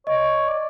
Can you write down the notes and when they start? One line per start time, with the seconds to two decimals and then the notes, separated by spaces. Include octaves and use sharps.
0.06 C#5 D#5
0.48 D5